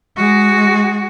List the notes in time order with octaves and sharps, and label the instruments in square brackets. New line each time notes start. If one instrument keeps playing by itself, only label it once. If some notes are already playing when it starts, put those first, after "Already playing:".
[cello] G#3 F#4